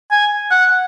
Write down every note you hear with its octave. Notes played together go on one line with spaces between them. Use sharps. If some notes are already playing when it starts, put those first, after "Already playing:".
G#5
F#5